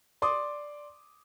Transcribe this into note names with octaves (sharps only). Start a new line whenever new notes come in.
D5 C6 D6 D#6